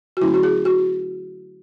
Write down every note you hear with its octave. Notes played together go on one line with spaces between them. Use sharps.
F#4
D3 F#3 A3 C#4 E4
F#4
G#4
F#4